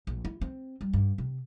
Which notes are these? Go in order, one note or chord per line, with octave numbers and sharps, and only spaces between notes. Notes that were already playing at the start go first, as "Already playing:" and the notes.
A#1
E4
C4
G3
G2
C3